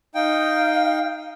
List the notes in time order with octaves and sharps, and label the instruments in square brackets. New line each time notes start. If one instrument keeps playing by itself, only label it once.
[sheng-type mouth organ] D#4 G5 [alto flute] F5